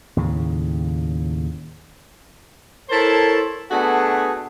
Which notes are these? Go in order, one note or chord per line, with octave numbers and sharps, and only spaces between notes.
D#2 A2 C#3
E4 A4 A#4 C5 C#5 A5
A3 B3 D4 F#4 G#4